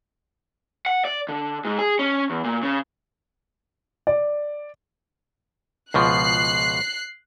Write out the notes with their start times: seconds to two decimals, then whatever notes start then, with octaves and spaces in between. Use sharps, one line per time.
0.86 F#5
1.05 D5
1.29 D3
1.65 G#2
1.79 G#4
1.99 C#4
2.30 E2
2.44 A#2
2.63 C#3
4.07 D5
5.94 C#2 B2 F3 F#6 C7